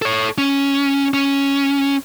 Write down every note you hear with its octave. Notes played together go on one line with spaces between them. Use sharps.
A4 C#5
C#4
C#4